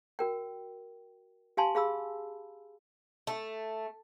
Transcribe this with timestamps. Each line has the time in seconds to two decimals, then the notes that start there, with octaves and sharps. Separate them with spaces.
0.19 F#4 A#4 G5
1.57 G4 F5 G#5 A5 C6
1.75 G#4 F5 B5 E6
3.27 A3